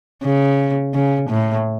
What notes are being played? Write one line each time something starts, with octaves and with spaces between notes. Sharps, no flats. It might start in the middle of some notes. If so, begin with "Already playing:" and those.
C#3
C#3
A2